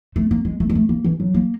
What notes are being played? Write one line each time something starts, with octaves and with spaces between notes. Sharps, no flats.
A3
A#3
G#3
A3
G#3
A3
A#3
E3
F#3
A#3